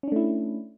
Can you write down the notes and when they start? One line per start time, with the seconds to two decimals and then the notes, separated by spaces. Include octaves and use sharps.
0.03 C#4
0.08 D4
0.12 A3
0.16 E4